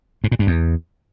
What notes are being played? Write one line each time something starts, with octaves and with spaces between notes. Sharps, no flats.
G#2
A#2
G2
E2